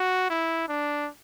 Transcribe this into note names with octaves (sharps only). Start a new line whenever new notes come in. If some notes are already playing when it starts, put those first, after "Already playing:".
Already playing: F#4
E4
D4